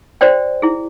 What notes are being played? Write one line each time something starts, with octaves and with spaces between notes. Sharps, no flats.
F#4 C5 D5 G5
E4 G#4